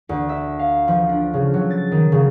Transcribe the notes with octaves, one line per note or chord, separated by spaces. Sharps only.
D2
E5
F5
F3
D4
C#3
F#3
A6
D#3
C#3